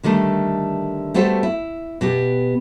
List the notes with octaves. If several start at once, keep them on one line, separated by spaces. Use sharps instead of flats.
D3 D#3 G3 A3
G3 A3 B3 F#4 A4 C5
E4
B2 B3 G4